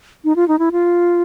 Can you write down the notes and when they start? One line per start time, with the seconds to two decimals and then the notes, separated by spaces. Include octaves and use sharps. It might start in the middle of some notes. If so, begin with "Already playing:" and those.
0.24 D#4
0.36 F4
0.48 D#4
0.59 E4
0.72 F4